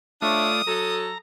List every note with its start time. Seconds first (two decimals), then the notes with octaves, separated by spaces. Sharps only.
0.22 A3 D4 F4 C#5 D5 E5 D#6
0.67 F#3 A4 A#5